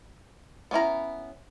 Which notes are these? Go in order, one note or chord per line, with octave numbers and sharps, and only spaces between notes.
B3 C#4 E4 A#5